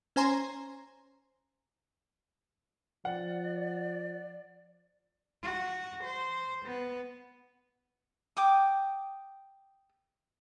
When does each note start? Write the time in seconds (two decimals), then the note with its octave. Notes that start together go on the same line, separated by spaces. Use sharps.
0.16 C#4 C5 G#5 A#5 C6
3.05 F3 D5 F#5
5.43 F#4
6.04 C5
6.66 B3
8.37 G5 D6 D#6